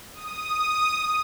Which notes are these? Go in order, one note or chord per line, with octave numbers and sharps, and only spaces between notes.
D#6